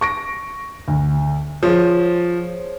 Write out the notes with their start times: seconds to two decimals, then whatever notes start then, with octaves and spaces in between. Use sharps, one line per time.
0.01 C#6 A#6 D7
0.88 D2
1.63 F3 G#4 C5 C#5